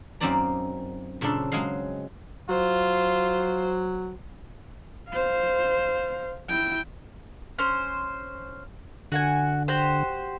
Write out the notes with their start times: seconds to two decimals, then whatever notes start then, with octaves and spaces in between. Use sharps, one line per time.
0.20 F#2 A#3 C4 D#4 D5 A#5
1.21 A#2 C#3 C4 D4 A4
1.52 F#3 G#3 G#4 D#5 F5
2.49 F#3 F4 C5
5.09 C5 F5
6.49 E4 G5
7.59 C#4 C5
9.12 D3 F#4 F#5 G#5
9.68 F#4 G4 C5